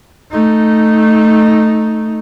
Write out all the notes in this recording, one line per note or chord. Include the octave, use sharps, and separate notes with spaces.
A3 D#4